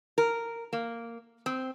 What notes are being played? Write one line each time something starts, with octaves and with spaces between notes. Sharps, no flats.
A#4
A#3
C4